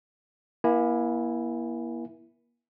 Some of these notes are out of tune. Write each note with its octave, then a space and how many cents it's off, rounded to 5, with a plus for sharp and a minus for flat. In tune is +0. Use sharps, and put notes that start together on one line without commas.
A#3 +40 E4 +0 G#5 -10